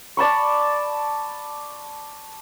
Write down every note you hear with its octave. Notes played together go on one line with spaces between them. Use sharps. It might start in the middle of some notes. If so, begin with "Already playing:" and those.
D5 A5 B5 C#6